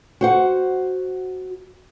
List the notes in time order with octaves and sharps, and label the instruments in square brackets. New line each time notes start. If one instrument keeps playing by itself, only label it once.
[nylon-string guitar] F#4 C5 F#5